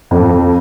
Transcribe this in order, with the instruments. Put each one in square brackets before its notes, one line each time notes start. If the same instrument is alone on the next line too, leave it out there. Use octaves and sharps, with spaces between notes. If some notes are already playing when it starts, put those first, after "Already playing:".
[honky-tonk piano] F2